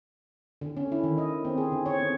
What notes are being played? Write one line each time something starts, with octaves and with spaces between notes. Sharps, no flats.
D3
C#4
E4
D#3
D#5
C4
G#4
D3
C#5
C4